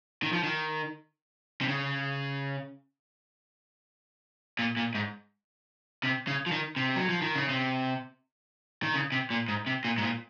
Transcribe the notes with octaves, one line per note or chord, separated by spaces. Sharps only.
D#3
F3
D#3
C3
C#3
A#2
A#2
G#2
C3
C#3
F3
D#3
C3
F#3
F3
D#3
C#3
C3
D#3
C#3
C3
A#2
G#2
C3
A#2
G#2
A#2